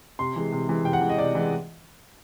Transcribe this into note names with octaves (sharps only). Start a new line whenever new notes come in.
C3 C6
E3 G#3
C3
E3 G#3
C3 G5
F#5
E3 G#3
D#5
C3 D5
E3 G#3